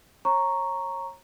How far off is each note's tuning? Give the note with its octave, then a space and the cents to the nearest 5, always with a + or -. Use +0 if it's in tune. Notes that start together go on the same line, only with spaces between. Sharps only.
C#5 -30 A#5 +0 C#6 +0